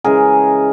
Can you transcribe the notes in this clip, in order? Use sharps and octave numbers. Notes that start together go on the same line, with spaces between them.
C#3 E3 G#3 G#4 A#4